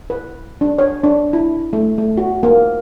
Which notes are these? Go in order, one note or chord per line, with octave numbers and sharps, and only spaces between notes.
B4
D4
C#5
D4
E4
A3
A3
F#4
A#3